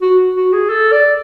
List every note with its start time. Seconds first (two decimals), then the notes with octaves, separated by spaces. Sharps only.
0.02 F#4
0.36 F#4
0.53 G#4
0.70 A4
0.92 D5